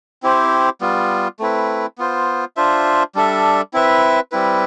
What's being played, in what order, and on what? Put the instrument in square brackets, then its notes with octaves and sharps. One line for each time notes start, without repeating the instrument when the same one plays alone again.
[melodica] C4 E4 G4 C5
G3 B3 F4
A3 C4 E4 B4
B3 F4 C5
D4 F4 C5 E5
G3 D4 A4 E5
C4 E4 B4 E5
G3 C4 E4 B4